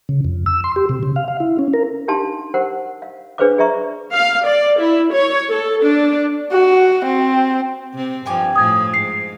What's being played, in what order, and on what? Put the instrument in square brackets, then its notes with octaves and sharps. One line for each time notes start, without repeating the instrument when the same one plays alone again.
[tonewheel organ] C#3
F2
E6
C6
G4
C3
C#3
F5
F5
E4
C#4
A#4
[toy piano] D4 D#4 G4 F5 A5 C6
G4 A#4 C5 F#5
F5
D4 G#4 B4 C5 F5 D6
G#4 D5 E5 A#5 C#6
[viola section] F5
D5
E4
C#5
A4
D4
[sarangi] F#4
C4
[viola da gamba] C3 C4
[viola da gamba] G2 F3 [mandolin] G5 G#5 D6
[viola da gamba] A2 F3 [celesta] D#6 G#6
[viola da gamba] G#2 [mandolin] F5 [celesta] C7